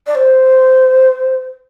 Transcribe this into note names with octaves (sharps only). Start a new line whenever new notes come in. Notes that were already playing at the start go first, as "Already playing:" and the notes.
D5
C5